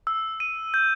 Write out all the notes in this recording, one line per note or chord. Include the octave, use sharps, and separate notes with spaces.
E6
D#7
G6